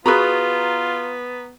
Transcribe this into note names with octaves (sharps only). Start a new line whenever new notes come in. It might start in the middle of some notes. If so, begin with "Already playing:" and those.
B3 F4 F#4 G#4 B4 A#5 B5 C#6